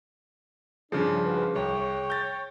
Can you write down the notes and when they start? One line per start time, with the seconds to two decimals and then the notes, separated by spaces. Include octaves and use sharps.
0.92 G2 C#3 F3 D4 G#4
1.26 G#2 F#4 B4
1.55 C2 C#5 G5
2.10 G6 A6